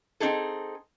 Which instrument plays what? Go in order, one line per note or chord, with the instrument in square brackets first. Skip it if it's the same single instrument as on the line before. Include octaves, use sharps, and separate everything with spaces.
[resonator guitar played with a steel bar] C4 D#4 G#4 A4